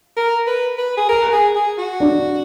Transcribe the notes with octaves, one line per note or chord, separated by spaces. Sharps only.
A#4
B4
B4
G#4
A#4
G#4
G#4
F#4
D4